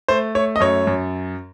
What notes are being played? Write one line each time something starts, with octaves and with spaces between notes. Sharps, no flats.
A3 C5
A3 C#5
D#5
F#2 C#5
F#2